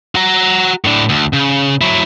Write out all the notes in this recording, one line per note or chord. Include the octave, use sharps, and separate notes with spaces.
F#4 A#5
A2 D4
D2
C#3
F#3 E4